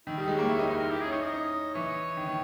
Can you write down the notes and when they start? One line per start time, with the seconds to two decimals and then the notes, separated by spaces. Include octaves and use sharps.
0.07 D#3 E4
0.18 G3 D#4
0.28 G#3
0.35 A#3 C#5
0.49 E4 C#5
0.59 D#4
0.62 C#5
0.70 D#4
0.77 A#4
0.91 E4 G4
1.01 C#4 G#4
1.12 D#4 C#5
1.22 D#5
1.32 C#4
1.74 E3 C#5
2.17 D#3
2.28 D#3